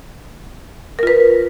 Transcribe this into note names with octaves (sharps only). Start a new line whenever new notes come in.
F4 A#4 B4